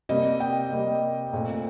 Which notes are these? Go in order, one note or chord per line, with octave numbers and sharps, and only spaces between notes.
C3 G3 A#3 D#5
G5
C3 G3 A#3
A#2 A3 C4